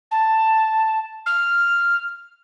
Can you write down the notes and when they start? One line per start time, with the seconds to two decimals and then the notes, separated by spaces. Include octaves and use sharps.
0.11 A5
1.26 F6